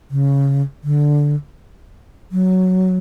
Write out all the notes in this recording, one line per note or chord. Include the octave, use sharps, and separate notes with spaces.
C#3
D3
F#3